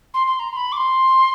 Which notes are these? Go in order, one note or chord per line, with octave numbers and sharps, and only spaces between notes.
C6
C6
A#5
C6
B5
D6
C6